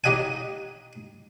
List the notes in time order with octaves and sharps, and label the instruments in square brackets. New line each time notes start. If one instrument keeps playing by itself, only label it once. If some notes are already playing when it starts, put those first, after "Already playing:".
[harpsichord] D#4 G4 D#5 F#5 G#5